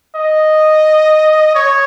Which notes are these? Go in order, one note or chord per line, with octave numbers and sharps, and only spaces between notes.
D#5
C#5